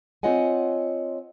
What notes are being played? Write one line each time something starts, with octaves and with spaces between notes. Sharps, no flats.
C4 F4 C#5 D#5 F#5 G#5